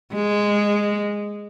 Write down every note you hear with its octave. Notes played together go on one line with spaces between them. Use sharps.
G#3